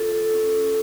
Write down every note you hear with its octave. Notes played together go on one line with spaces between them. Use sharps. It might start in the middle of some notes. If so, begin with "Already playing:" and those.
Already playing: F4 A4
C#4